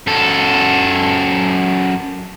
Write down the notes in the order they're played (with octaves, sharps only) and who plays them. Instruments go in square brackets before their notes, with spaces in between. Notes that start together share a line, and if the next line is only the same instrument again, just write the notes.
[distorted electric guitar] F#2 A4